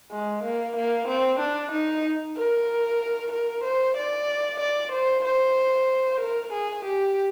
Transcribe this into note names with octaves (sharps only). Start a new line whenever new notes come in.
G#3
A#3
A#3
C4
D4
D#4
A#4
A#4
C5
D5
D5
C5
C5
A#4
G#4
G4